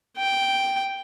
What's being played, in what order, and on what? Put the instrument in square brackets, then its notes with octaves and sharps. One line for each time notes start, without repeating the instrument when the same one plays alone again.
[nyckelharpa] G5